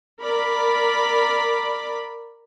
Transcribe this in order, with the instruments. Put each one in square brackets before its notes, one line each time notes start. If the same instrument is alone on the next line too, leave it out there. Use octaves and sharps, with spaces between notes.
[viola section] A#4 D5 B5